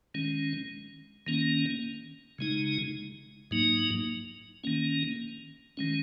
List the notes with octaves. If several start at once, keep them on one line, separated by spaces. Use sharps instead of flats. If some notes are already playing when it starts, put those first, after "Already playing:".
D#3 G#3 C#4
D#3 A#3 C#4
C#3 G#3 D#4
G#2 F#3 A#3 D#4
D#3 A#3 C#4
D#3 G#3 C#4